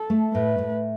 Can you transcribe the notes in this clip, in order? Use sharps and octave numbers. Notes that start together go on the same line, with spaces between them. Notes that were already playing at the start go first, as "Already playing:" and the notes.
Already playing: A4
A3
A2 B4
A2